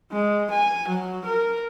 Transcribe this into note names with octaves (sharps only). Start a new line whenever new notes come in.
G#3
G#5
F#3
A#4